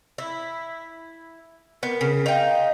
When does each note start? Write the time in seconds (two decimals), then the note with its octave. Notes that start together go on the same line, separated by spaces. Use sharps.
0.18 E4
1.83 B3 A#4
2.01 C#3
2.26 D#4 F5 G5